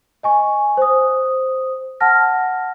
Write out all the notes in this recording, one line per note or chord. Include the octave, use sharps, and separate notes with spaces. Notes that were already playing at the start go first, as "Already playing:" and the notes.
D#5 G#5 C#6
C5 D#6
F#5 A5 F6 A#6